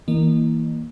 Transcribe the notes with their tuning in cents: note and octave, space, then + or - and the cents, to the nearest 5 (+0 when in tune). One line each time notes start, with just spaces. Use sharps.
E3 -30 A#3 +0 D#5 -25